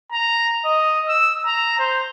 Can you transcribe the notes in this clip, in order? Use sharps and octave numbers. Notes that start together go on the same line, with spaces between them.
A#5
D#5
E6
A#5
C5